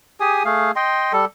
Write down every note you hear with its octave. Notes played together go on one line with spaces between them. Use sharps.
G4 G#4 G#5 D#6
A3 G#4 F5
D#5 G5 C6
G3 A4